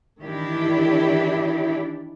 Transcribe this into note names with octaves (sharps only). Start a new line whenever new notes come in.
D#3 E3 D4 E4 G4